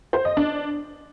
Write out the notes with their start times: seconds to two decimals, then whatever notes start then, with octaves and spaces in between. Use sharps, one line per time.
0.13 C5
0.25 D#5
0.37 D4